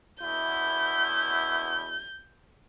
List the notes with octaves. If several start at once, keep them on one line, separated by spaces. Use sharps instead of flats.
E2 B2 E4 G6